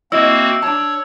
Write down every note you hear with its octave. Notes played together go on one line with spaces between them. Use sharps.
A#3 C4 E4 F#4 D#5 E6
D4 C#5 A5